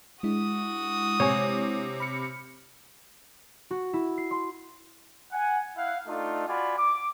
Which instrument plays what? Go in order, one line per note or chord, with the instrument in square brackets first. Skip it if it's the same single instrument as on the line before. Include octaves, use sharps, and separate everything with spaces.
[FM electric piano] G#3 D4 E4 [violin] F#4 D#6
[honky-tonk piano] C3 [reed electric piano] C#5 G#5
[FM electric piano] B5 F6 C#7
[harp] F#4
E4
C7
C6
[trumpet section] F#5 G#5
E4 F5 F#5
A3 D4 D#4 F4 A4
F4 F#4 D5 G#5 B5
D6